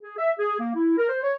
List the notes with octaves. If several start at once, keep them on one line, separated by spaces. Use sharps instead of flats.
G#4
E5
G#4
A#3
E4
A#4
C5
C#5